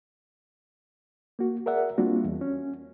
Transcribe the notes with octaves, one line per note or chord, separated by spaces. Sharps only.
A#3 F#4
G#4 A#4 D5 E5 F#5
G3 A#3 C4 D4 F4 F#4
E2
C#4